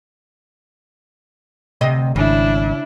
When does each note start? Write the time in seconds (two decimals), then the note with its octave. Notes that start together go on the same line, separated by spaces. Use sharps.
1.81 D2 C3 D#5
2.16 G#1 C#3 D4 E4